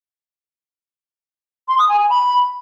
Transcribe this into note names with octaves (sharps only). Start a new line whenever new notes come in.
C6
D#6
G#5
G#5
B5